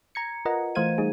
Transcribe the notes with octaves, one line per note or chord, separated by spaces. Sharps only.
A#5 G#6 C#7
F4 A#4 B4 D#5 F#5 A#5
E3 A3 C5 F5 G#6 D#7
G3 A3 D#4 G#4